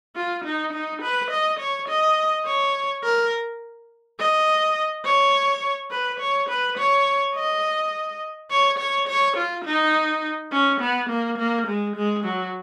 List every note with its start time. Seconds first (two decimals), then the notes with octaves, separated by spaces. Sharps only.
0.16 F4
0.45 D#4
0.73 D#4
1.02 B4
1.31 D#5
1.60 C#5
1.88 D#5
2.46 C#5
3.04 A#4
4.19 D#5
5.05 C#5
5.91 B4
6.20 C#5
6.49 B4
6.78 C#5
7.35 D#5
8.51 C#5
8.79 C#5
9.08 C#5
9.37 F4
9.65 D#4
10.52 C#4
10.81 B3
11.10 A#3
11.38 A#3
11.67 G#3
11.96 G#3
12.25 F#3